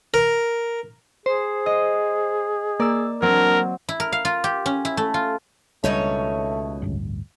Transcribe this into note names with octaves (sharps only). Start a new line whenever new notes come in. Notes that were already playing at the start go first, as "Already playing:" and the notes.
A#4
G#4 C5
D#5
A#3 D5 E6
F#3 C4 D4 A#4
E4
A#4
F5
F4
G4
C#4
E4
A3
F4
C#2 B2 G3 A3 D4 D#4 C#5
A1 D2 G2